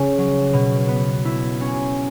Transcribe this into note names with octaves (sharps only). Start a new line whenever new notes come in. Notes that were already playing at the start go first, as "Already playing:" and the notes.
Already playing: C#3 C#4
F#3
B2
B3
E4
C#4